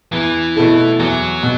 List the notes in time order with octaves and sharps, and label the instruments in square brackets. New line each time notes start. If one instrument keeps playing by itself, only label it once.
[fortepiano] E2 [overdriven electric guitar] E3
[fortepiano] B2 A3 E4 A4
[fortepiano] E2 [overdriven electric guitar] F#3
[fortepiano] B2